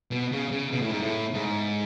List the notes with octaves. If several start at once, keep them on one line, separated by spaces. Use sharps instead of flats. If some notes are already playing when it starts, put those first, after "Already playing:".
B2
C#3
C#3
B2
A2
G#2
A2
G#2